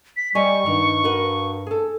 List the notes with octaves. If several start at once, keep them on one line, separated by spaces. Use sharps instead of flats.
B6
G3 G4 D#5 G#5 C#6
G2 D#3
F#4 A#4 B4
G#4 A4